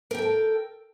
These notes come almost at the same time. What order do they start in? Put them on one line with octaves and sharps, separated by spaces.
A#4 G5 A4 A5